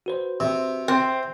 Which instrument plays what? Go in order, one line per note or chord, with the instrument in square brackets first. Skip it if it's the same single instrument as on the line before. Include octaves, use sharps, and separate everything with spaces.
[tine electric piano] F#4 B4 C5
[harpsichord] C3
[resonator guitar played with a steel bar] C4